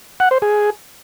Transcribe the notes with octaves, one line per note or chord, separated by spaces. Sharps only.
F#5
C5
G#4